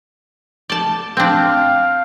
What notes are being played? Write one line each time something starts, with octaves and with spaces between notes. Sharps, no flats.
D5 A5
C4 D4 F5